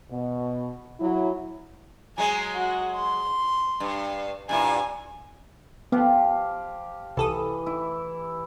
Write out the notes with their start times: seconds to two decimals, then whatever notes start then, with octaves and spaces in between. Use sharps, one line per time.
0.11 B2
1.00 F#3 E4
2.18 F#3 G#3 G#4 G#5
2.55 F#4
2.96 C6
3.80 G2
4.49 G2 A#2 E4 G#5
5.92 F3 B3 G4 F5
7.17 C2 E3 A4 D#6
7.66 E4